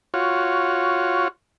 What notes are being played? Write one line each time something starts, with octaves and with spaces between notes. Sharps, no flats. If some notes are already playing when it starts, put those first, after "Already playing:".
F4 F#4 C#5